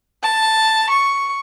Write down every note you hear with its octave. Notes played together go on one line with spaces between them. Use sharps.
A5
C#6